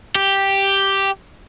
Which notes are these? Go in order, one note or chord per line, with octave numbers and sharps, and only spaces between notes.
G4